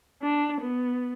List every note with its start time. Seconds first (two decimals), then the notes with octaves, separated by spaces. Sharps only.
0.22 D4
0.61 B3